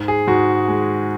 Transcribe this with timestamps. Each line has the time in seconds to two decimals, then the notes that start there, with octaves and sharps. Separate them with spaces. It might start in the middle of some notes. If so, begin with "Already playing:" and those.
Already playing: G#2
0.08 G#4
0.27 G#2 F#4
0.68 G#3